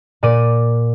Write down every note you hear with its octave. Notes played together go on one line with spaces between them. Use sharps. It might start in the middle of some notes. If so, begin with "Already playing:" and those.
A#2 D5 D#7